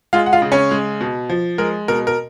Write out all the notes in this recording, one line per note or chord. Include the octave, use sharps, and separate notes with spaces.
G#3 F4 F5
F#5
F4 F5
C#3
C#4 C#5
G#3
B2
F3
G#3 A#4
B2 A#4
A#4